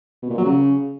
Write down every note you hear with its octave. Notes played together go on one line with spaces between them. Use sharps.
B2
A#2
F#3
C#3